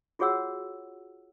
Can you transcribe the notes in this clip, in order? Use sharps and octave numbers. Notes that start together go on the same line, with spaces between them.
F4 F#4 G#4 C#5 F#5 E6